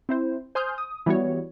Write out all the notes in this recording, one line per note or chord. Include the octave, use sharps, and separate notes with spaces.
C4 E4 C5
C5 G#5 C6 D#6 F6 G6
D#6
E3 G3 B3 F#4 C#5